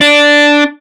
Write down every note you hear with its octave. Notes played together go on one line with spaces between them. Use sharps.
D4